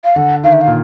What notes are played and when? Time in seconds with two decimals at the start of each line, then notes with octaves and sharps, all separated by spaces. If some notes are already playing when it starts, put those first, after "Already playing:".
0.04 F5
0.16 D3 F#5
0.44 D#3 F5
0.53 E5
0.61 F5
0.67 A#2